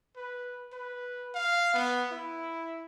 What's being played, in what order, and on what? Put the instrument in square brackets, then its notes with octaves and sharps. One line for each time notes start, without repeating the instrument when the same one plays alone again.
[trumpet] B4
B4
F5
B3
E4